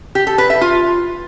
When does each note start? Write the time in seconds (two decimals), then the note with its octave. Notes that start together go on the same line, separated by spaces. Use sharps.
0.15 G4
0.27 A4
0.38 B4
0.50 E5
0.61 F4